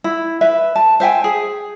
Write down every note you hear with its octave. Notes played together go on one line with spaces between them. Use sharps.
E4
B4 E5
A5
C5 E5 G5 G#5
G#4